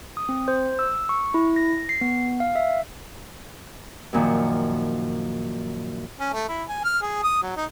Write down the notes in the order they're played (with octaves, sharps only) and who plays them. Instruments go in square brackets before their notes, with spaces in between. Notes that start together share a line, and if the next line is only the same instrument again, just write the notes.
[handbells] D#6
C4
C5
E6
C#6
E4
A#6
C7
B3
F5
E5
[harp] F#2 A#2 D#3 F3
[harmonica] C#4
A3
E4
G#5
F6
G#4
D#6
F#3
D#4